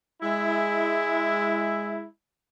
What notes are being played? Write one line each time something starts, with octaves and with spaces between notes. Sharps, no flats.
G#3 E4